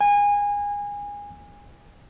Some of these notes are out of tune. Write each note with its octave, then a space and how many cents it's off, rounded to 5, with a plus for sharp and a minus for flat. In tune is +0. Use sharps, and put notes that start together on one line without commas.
G#5 -25